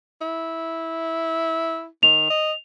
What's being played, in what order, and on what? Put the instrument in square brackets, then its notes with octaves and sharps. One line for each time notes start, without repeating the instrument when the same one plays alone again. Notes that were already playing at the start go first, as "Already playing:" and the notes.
[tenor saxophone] E4
[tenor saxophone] D#3 [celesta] F7
[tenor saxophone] D#5